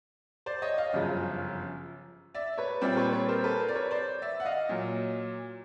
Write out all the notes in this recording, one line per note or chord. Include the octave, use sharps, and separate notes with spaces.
C5 D5
C#5 D#5
D#5 F5
G1 F#2 C#3 F3
D5 E5
B4 C#5
A#2 G3 C4 F4 C5 D5
B4 C#5
B4 C#5
A#4 C5
A4 B4
A#4 C5
D5
B4 C#5
C5 D5
D5 E5
F#5
D#5 F5
A#2 F#3